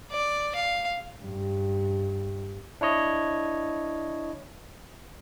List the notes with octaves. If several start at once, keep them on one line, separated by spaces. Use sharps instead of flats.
D5
F5
G2
D4 E4 C#5 D#5